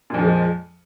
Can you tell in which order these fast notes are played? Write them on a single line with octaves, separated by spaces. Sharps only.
A#2 F2 F3 G#3